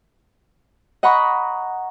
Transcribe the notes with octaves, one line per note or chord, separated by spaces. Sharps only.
D#5 F#5 A#5 B5 C#6